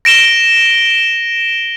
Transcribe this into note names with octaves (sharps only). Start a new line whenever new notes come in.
A#6 D7 E7 G7